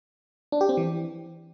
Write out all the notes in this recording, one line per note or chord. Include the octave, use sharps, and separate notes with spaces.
D4
G4
C4
E3